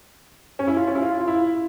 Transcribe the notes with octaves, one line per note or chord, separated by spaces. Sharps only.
C#4
E4
F4
C#4
E4
F4
F4
E4